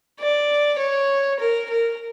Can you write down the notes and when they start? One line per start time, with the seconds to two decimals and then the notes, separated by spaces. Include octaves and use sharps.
0.20 D5
0.79 C#5
1.39 A#4
1.70 A#4